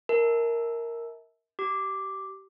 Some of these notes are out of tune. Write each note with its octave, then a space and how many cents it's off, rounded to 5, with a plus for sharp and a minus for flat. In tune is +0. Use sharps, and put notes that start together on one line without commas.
A#4 +0 E5 -35 A5 -30
G4 -25 D6 +0